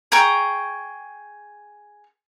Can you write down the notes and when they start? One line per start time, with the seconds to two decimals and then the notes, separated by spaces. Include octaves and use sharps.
0.12 G#4 G5 A#5 C#6